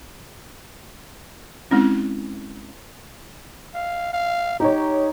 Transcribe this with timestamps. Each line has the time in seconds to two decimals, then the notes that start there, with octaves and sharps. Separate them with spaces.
1.71 G#3 C4 C#4 E4
3.74 F5
4.13 F5
4.60 D#4 G4 C#5